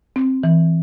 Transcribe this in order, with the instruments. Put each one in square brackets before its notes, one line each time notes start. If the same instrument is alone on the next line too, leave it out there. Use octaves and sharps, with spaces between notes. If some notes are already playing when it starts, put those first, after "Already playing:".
[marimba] C4
E3